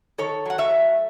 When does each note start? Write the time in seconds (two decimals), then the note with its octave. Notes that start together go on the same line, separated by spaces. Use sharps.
0.18 D#3 A4 C#5
0.45 F#3 F#5
0.58 C#5 E5
0.71 A3